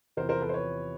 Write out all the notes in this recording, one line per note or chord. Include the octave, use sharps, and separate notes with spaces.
E2 C3 F3 A#4 C5
A#4 C5
A4 B4
C5
B4 C#5